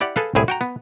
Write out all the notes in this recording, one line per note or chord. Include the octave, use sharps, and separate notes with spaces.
E4 G4 D5 F#5
G#4 A4 B4 F5
C2 A2 E4 G#4
F#4 G5 A#5
B3